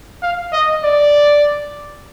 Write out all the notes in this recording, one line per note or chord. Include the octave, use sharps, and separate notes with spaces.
F5
D#5
D5